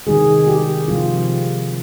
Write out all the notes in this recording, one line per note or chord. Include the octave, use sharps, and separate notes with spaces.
C3 D#3 G#3 G#4
G4
C3 F3 G#3 F4